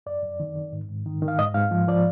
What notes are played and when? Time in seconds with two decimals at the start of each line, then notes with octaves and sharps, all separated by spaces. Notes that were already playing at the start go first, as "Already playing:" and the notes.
0.06 F#2 D5
0.22 F#2
0.40 D#3
0.56 D#3
0.72 G#2
0.89 G#2
1.06 D#3
1.22 D#3
1.28 F5
1.39 G#2 D#5
1.54 G#2 F5
1.71 F3
1.88 F3 D5